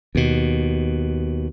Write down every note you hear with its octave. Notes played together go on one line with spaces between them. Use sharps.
D#2 B2